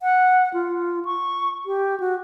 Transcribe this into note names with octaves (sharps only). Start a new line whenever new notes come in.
F#5
F4
C#6
G4
F#4